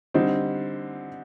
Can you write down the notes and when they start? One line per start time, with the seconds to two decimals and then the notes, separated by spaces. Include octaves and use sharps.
0.14 D3 G3 C4 D#4